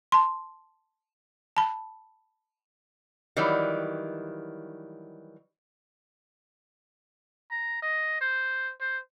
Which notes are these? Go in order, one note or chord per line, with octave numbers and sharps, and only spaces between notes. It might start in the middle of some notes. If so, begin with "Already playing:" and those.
A5 C6
A5 B5
D#3 E3 F#3 G3
A#5
D#5
C5
C5